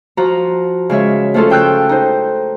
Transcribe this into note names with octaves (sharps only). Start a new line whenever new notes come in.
F3 F#4 A#5
C#3 G#3 C#5 E5
F3 A3 C#4 F4 A4
C#3 G5 E6 F#6 G6
D#4 C5